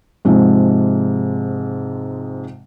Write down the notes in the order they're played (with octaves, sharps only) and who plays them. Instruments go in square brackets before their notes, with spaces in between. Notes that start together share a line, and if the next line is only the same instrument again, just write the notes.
[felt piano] G#2 C3 F3 G#3